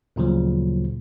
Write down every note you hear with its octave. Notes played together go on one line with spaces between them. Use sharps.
D2 A#2 C#3 F3 F#3